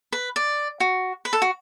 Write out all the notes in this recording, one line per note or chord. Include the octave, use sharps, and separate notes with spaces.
B4
D5
F#4
B4
A4
F#4